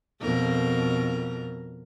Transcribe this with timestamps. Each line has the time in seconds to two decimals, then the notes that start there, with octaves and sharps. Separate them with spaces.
0.21 F2 B2 A#4